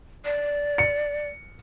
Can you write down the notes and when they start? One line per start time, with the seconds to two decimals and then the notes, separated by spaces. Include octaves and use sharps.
0.25 D5
0.78 C#7